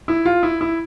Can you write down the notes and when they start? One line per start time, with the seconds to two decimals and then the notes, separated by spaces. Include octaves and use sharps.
0.08 E4
0.25 F4
0.43 E4
0.61 E4